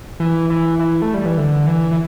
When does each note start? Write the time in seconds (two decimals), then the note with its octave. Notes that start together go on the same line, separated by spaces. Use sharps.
0.20 E3
0.50 E3
0.79 E3
1.02 A3
1.14 G3
1.26 E3
1.38 D3
1.67 E3
1.91 E3